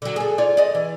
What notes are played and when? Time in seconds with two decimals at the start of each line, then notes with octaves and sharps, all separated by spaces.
0.02 D3 F#3
0.16 G#4 A4
0.38 F4 C#5 D5
0.57 D5 D#5
0.75 E3